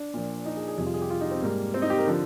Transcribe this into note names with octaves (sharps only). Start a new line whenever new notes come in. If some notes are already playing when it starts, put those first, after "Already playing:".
Already playing: D4
A#2 F3
D#4
G#4
G#4
F2 C3 G3 G#4
F4
G#4
G4
F4
D#4
C4
G#2 G3 A#3
C4
D#4
G4
A#4
D3 F3